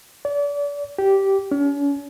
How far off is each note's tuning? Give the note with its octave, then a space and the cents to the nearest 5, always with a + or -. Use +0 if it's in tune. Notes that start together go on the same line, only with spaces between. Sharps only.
D5 -35
G4 -10
C#4 +40